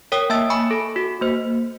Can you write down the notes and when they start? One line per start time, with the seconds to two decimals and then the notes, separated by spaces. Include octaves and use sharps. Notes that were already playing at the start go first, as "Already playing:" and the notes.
0.12 A#4 C#5 G5 D#6
0.30 A#3 E5 A5 E6 A6
0.50 G#5 B5 C#6
0.71 A4
0.96 F#4
1.21 A#3 C5